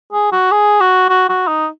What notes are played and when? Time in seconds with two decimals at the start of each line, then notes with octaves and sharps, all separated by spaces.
0.13 G#4
0.32 F#4
0.51 G#4
0.80 F#4
1.09 F#4
1.29 F#4
1.47 D#4